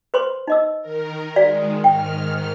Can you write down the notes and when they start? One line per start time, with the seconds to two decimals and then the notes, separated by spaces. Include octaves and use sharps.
0.14 B4 C5 C6
0.48 D#4 D#5 E6
0.81 D#3 A#4
1.36 D#3 G#3 F#4 D5 F5
1.84 G#2 D#3 G5 F6